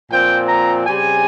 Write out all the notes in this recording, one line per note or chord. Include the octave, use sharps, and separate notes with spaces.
A#2 F3 C4 G5
A#5
C#3 G3 C4 G#5